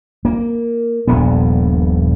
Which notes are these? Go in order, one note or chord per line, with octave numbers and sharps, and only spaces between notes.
A#3
D#1 A#1 G2 B3